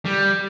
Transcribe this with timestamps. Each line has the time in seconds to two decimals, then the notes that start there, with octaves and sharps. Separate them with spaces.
0.06 G3